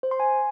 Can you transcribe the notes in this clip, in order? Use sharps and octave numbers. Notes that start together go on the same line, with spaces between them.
C5
C6
G#5